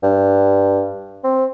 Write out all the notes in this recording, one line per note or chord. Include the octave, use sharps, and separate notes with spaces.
G2
C4